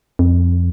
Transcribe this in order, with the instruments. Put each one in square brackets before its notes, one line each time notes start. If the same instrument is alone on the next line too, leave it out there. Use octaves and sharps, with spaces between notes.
[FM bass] F2